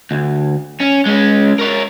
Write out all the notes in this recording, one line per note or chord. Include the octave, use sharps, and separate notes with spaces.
D2
C#4
G#3 C#4
A#4 C#5